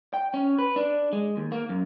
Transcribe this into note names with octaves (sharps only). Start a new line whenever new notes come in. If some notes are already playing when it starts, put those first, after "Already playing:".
G5
C#4
B4
D4
G#3
D#2
A#3
F#2